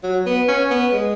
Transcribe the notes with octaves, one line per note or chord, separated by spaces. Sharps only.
F#3
B3
C#4
B3
G#3